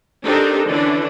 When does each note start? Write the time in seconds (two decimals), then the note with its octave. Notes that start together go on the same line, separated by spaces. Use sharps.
0.24 C4 D4 D#4 G4 A4 A#4
0.67 D3 E3 C#4 D4